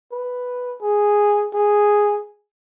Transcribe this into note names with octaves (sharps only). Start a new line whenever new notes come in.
B4
G#4
G#4